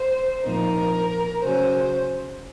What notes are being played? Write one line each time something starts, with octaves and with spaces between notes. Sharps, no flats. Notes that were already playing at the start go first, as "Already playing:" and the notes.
Already playing: C5
A#2 F3 C4 D#4 A#4
C#3 F#3 C#4 C5